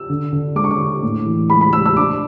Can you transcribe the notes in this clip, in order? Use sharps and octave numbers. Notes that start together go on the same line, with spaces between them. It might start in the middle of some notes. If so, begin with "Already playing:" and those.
Already playing: E6
D3
D3
G#3 D6
C#6
D6
D3
A2
E3
G#3 B5
B5
G#3 E6
E6
D4 D6